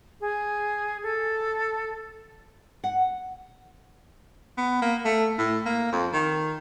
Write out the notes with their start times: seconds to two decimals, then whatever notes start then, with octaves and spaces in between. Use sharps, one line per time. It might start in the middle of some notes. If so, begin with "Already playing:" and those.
0.21 G#4
1.03 A4
2.84 F#5
4.57 B3
4.82 A#3
5.05 A3
5.38 A2
5.65 A#3
5.92 F2
6.13 D#3